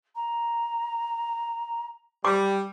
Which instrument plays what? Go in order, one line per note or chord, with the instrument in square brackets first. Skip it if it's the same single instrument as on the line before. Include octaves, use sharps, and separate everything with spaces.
[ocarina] A#5
[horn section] G3 [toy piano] D6